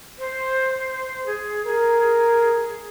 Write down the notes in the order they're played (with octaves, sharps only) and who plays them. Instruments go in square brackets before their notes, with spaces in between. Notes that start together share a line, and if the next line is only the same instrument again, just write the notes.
[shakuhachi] C5
G#4
[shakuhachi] G#4 [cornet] A#4